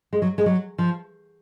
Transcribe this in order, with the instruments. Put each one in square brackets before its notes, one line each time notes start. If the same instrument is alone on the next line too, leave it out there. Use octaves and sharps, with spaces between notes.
[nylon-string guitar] G#3
F#3
G#3
F#3
F3